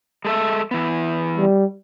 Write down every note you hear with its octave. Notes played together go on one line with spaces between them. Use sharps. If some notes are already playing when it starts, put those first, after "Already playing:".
G#3 A4 E5
E3 B3
G3